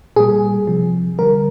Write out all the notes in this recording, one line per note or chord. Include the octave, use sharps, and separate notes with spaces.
A#2 G3 G#4
C3 F3
D3 G3 A#4